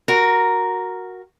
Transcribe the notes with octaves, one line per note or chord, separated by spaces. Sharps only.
F#4 A#4